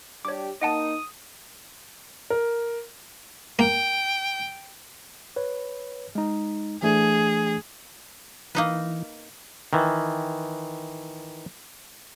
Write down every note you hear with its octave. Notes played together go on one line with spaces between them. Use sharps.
G3 D4 G4 C#5 D6
A#3 D#4 D#5 F#5 A5 D#6
A#4
A#3 G5
B4 C#5
G#3 D#4
E3 A3 D4 G#4
E3 A#3 D#4 B4
D#3 E3